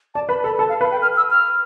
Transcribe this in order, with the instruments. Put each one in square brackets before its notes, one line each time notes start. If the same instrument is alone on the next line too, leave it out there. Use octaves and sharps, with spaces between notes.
[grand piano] D5 [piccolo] A5
[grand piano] B4 [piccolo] B5
[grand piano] A4 [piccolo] B5
[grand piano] A4 [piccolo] A5
[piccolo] F5
[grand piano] B4 [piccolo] F5
[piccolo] G5
F6
E6
F6